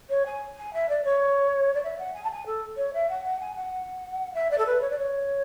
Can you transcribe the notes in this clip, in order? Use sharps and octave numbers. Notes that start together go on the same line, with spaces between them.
C#5
G#5
G#5
E5
D5
C#5
D5
E5
F#5
G#5
A5
G#5
A4
C#5
E5
F#5
F#5
G#5
F#5
E5
D5
A4
B4
C#5
D5
C#5